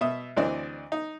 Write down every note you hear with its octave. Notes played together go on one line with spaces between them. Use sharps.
B2 E5 D#6
D2 E3 C4 D4 D5 D#5
D#4